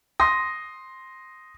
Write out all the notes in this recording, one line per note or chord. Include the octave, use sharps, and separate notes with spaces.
C6 D#6 A#6